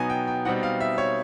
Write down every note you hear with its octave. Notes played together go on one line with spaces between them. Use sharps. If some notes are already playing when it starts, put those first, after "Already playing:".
Already playing: B2 F#3 B3 D#4 G#5
G5
G5
B2 G3 C4 D#4 F#5
F5
E5
C#5